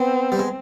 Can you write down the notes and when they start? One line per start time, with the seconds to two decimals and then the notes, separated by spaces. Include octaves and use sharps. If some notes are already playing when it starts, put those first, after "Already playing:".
Already playing: B3 C4
0.32 G3
0.39 G#3